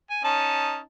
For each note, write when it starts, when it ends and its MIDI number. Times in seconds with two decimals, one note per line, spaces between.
0.10 0.23 80
0.24 0.79 61
0.24 0.79 63
0.24 0.79 81